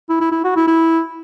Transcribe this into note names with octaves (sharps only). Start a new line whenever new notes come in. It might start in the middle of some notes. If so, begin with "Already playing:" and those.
E4
E4
E4
F#4
E4
E4